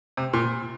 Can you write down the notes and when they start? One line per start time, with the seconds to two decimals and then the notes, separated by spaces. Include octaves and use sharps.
0.17 C3
0.33 A#2